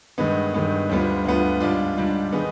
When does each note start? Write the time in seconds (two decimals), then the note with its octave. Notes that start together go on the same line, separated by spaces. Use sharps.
0.18 G2 D#3 G#3 B3
0.54 G2 D#3 G#3 B3
0.90 D2 D3 G3 B3 F4
1.25 D2 D3 G3 B3 F4
1.60 G#2 G3 D4 F4
1.97 G#2 G3 D4 F4
2.32 D#3 B3 D#4 G#4